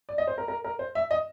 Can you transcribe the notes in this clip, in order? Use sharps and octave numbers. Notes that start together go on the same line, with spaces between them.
D5
D#5
C5
A#4
A#4
A#4
C5
E5
D#5